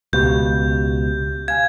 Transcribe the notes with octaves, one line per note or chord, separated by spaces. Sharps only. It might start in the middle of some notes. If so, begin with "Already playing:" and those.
C#2 B2 G4 G6
F5 G#5 G#6